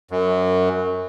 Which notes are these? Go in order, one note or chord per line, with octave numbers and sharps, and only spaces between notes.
F#2